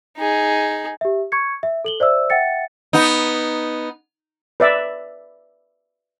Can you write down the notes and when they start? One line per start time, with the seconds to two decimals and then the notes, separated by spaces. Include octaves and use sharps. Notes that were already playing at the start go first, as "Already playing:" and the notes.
0.18 D#4 G#4
1.01 G4 E5
1.32 C#6 G#6 C#7
1.63 E5
1.85 A4 F#7 G7
2.00 C5 D5 E5 E6
2.30 E5 F#5 G5 A6 C#7
2.93 B3 D#4
4.60 B4 D5 E5